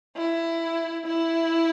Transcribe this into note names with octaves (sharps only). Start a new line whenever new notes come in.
E4
E4